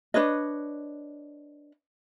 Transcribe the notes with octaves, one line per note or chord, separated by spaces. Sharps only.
D4 B4 C#5 D#5